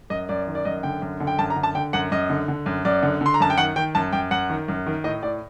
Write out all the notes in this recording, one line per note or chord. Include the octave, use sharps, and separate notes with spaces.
F#2 D#5
F#2 D5
D#3
D5
F#2 D#5
D3 G5
F#2
D3
G5
F#2 A5
A#5
D3
A5
D3 G5
F#2 F#5
F#2 D#5
D3
D3
F#2
F#2 D5
D3
D3 C6
A#5
F#2 A5
G5
D#3 F#5
D#3 G5
F#2 A5
F#2 G5
F#2 F#5
D#3
F#2
D#3
A2 D#5
A2 D5